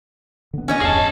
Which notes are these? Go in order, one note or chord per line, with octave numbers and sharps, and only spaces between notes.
D3 B3
C#4 C#5 D#5
D1 E2 G2 G#4 A5